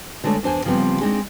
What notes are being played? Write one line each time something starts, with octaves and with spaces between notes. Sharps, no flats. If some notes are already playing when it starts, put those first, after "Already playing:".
D3 G#3 A3 D4 C#5
E2 D4 C5 G#5
C#3 F3 G3 B3 C4
G#3 C4 D4 D#4 G#4